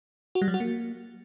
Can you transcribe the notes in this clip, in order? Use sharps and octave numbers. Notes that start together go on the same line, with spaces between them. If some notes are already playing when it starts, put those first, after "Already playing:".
F#4
G3
F#3
F#4
A#3